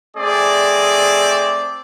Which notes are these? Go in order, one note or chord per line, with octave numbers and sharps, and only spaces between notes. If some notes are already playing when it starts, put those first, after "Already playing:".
A3 C4 G#4 D5